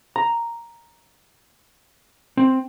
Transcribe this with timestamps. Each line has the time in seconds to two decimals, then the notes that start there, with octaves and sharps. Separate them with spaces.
0.16 A#5
2.37 C4